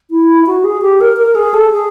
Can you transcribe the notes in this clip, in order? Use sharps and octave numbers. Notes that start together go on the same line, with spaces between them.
E4
F#4
G#4
G4
A#4
A#4
G#4
A4
G#4